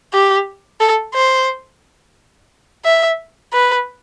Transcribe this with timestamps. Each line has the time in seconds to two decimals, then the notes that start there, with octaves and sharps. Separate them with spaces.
0.13 G4
0.80 A4
1.14 C5
2.85 E5
3.53 B4